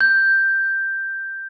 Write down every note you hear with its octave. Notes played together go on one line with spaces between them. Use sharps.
G6